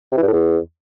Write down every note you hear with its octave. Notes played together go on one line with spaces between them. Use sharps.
C3
E3
G2
A2
E2